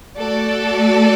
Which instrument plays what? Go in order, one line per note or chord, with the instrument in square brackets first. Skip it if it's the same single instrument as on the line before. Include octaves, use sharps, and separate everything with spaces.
[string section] A3 F#4 A4 D5